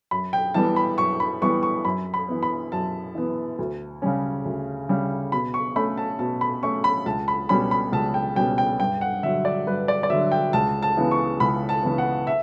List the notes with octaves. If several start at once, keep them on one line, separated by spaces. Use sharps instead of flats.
F#2 B5
G5
E3 G3 B3 A5
B5
F#2 C#6
B5
E3 G3 B3 C#6
C#6
F#2 B5
B5
E3 B3
B5
F#2 A5
E3 B3
D2
C#3 G3 C#4
D2
C#3 G3 C#4
B2 B5
C#6
A3 C#4 B5
A5
B2 A5
B5
A3 C#4 C#6
B5
C#2 A5
B5
B2 G3 C#4 B5
B5
C#2 A5
G5
B2 G3 C#4 G5
G5
G2 G5
F#5
D3 F#3 E5
D5
G2 B4
D5
D5
D3 F#3 E5
G5
C#2 A5
A5
C#3 E3 B3
C#6
C#2 B5
A5
C#3 E3 B3
F#5
E5